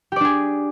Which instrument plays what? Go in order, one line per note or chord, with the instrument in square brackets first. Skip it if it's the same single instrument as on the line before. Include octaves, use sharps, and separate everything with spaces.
[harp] G4
D5
D4
G#4